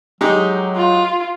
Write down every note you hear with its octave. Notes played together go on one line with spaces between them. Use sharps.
F#3 G#3 D#4 G4
F4